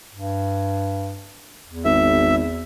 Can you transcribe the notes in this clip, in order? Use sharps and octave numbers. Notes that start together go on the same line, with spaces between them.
G2
E2
G#1 E5